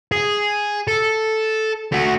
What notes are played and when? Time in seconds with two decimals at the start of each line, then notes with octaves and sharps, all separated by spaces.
0.12 G#4
0.88 A4
1.92 A3 F#4